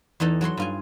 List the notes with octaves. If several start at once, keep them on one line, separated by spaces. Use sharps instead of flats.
E2 E3 D#4 A4 A#5
F#3 A4 C#5 C6
G2 F4 G#5